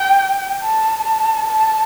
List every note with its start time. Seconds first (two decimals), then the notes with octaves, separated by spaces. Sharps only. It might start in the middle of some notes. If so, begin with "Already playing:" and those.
Already playing: G5
0.63 A5
1.05 A5
1.48 A5